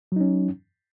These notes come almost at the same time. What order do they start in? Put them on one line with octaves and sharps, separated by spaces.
F#3 D#4 C#4